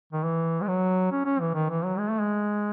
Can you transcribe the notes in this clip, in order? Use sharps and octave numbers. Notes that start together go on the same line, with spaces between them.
D#3
E3
G#3
F#3
C#4
C#4
E3
D#3
E3
F#3
G#3
A3
G#3